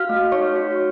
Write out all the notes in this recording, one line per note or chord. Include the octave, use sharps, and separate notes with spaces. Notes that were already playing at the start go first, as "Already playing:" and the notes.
Already playing: F#4 F5 F6
A3
D#4 C#5 C#6
F#4